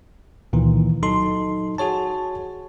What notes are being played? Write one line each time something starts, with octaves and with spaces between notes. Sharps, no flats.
C#2 A#2 D#3 E3
F#3 D#4 A4 C6
F#4 G#4 C#5 A5